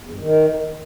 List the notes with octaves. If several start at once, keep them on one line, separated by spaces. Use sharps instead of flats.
E2
G2
D#3